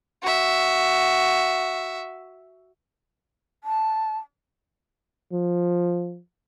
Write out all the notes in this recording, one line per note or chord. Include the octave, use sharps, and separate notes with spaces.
F#4 E5
A5
F3